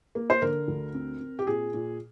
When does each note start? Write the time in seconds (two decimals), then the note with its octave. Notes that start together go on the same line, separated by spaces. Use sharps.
0.15 A#3
0.30 C5
0.42 D3 A#4
0.68 D2
0.94 C4
1.21 C4
1.39 G4
1.47 A#2 G#4
1.74 A#2